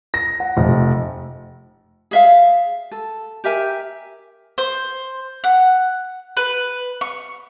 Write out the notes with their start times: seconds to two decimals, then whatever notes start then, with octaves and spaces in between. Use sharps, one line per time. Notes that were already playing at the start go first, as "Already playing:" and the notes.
0.14 A#6
0.40 F#5
0.57 F1
2.11 G#4 E5 F5
2.91 A4
3.44 G4 A#4 E5 G#5
4.58 C5
5.44 F#5
6.37 B4
7.01 C#6